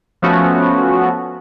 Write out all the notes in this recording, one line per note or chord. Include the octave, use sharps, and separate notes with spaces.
F3 A3 B3 C#4 F#4